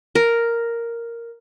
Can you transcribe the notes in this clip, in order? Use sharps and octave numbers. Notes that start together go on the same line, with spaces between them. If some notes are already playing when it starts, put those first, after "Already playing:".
A#4